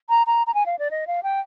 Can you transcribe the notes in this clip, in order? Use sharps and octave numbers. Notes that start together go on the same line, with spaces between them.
A#5
A#5
A#5
G#5
F5
D5
D#5
F5
G5